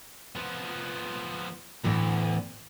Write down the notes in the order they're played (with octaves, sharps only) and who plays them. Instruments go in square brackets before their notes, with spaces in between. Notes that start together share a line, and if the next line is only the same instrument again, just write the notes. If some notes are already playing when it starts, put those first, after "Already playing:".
[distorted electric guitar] F3 B3
[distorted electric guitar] D2 [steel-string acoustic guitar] A2 E3 B3